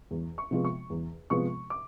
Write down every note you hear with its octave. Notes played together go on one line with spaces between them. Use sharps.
E2
C#6
C3 F3 G#3 B3
C#6
E2
C3 F3 G#3 B3 C#6
D6